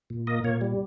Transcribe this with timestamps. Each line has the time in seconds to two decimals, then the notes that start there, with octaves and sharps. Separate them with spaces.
0.10 A#2
0.27 A#3 D#5
0.44 A#2 C#5
0.61 G3